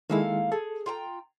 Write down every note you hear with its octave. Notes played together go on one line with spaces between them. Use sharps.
D#3 G#3 A#3 E4 A4 F5
G#4 A4
F4 G5 A#5